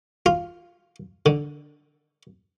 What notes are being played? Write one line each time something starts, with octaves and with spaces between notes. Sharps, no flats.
F4
D3